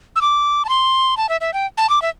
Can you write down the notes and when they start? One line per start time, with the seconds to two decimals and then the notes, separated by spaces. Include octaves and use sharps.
0.16 E6
0.21 D6
0.65 A5
0.69 C6
1.17 A5
1.29 E5
1.41 E5
1.54 G5
1.78 A5
1.90 D6
2.02 E5